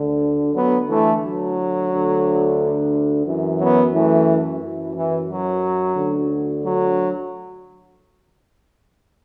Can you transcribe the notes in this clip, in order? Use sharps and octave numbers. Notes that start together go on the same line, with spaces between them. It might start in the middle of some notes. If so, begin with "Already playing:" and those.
Already playing: D2 D3
D2 D3 F#3 B3
E3 A3
F#3
D2 D3
F#2 E3
F#3 B3
E3 A3
F#2 E3
E3
F#3
D2 D3
F#3